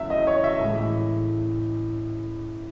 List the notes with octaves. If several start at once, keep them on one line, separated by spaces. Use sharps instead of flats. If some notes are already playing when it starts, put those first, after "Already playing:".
Already playing: E2 C#3 F#3 A3 E5
D#5
C#5
E5
A2 E3 G#3